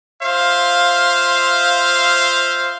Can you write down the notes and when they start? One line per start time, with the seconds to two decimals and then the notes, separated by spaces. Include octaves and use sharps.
0.23 F4 C5 E5 F5